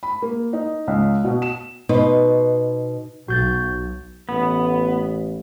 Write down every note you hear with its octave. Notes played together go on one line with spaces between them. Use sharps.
B5
A#3
D#4
C#2
B2
E7
B2 D#4 B4 C5
B1 F#4 G6 A6
A1 B3